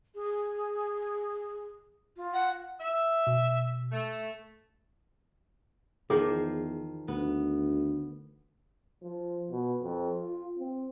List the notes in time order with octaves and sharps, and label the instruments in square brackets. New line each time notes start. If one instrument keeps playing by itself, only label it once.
[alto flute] G#4
F4
[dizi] F#5
[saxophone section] E5
[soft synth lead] B2
[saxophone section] A3
[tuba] E2 [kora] D#3 F3 C5 [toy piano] G#4
[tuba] D2 [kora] B3
[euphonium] F3
B2
F2
F4
C4